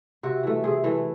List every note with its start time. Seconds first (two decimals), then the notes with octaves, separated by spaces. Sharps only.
0.23 C3 F#4
0.43 E3 A3
0.64 C3 G#4
0.84 E3 A3